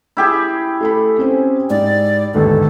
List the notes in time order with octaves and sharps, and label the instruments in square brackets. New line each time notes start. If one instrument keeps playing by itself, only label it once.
[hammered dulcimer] E4 G4 G#4
[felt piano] A3 A4 B5
C4 C#4 C5
[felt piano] G#2 [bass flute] D5
[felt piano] G1 D#2 G#2 [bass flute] A4